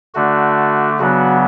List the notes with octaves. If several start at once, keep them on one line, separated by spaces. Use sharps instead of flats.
D3 A3 D4 F#4
C#3 F#3 B3 D4 F#4